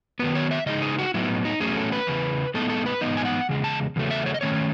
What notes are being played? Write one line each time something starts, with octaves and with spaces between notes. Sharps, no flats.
D#3 F#3 B3 B4
C#5
E5
C#3 E3 G#3 D#4 D#5
G#4
F#4
A2 F#3 B3 D#4 E4
D#4
E2 D#3 F#3 A3 C#4 G#4
A4
B4
E2 C#3 E3
A2 G#3 B3 D#4 A4
A4
B4
G#2 E3 B3 D#4 D#5
G#5
F#5
E2 C#3 G#3
A5
E2 C#3 F#3 A3
E5
C#5
D#5
D#3 A3 C#4 C#5